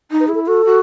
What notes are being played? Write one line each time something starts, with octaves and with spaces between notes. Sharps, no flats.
D#4
B4
E4 G#4
A4
F#4 A4
F#4